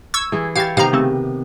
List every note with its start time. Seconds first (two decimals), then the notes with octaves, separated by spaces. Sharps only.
0.14 C#6 E6 G#6
0.32 E3 E4 G#4
0.56 E4 G4 C#5 F5 A6
0.77 C3 D#3 B3 F5 A#5
0.93 C#3 A3 C4